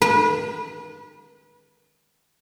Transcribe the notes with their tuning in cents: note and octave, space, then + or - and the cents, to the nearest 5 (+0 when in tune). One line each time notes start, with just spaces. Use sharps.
B4 -30